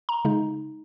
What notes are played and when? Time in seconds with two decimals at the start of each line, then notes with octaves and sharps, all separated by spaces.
0.09 A#5
0.25 C#3 G#3 D#4